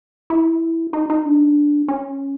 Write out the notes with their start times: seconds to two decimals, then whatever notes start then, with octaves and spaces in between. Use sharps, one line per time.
0.30 E4
0.93 D#4
1.10 D#4
1.25 D4
1.88 C#4